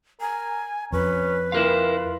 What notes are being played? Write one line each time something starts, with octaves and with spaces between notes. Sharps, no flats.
A#4 G#5
F2 C#4 B4
E4 F4 A#4 F5